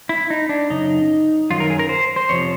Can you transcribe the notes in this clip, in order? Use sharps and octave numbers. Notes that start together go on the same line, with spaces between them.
E4
D#4
D4
F#2 C#3 D#4
F#2 D#3 F#3 F4
A#4
G#4
A#4
C5
C5
F2 C3 F3 C#5